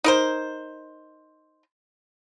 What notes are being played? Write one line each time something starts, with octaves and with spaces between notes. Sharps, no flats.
D#4 A#4 C5